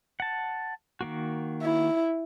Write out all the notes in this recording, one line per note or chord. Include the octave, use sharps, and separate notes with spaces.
F#5 A5
D#3 A#3 F#4
E4